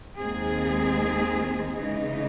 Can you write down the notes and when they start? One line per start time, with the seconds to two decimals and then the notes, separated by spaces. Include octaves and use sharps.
0.18 D#2 D#3 G#3 C4 G#4
1.76 C#3 E3 G#3 D#4